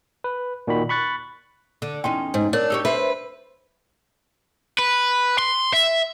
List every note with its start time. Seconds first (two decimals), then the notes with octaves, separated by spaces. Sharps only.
0.24 B4
0.67 A#2 D#3 F#4 B5
0.89 B5 C#6 F#6 A6
1.82 D3
2.04 E2 C#4 D#4 G5 C6
2.34 G#2
2.53 D4 A#4 C#5
2.70 D#4 G4 C#5 E6
2.85 B4 C5 E5
4.78 B4
5.39 C6
5.73 E5